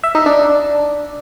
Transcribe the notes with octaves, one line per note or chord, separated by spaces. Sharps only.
E5
D#4
D4